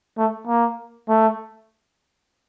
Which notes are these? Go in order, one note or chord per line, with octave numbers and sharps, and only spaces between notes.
A3
A#3
A3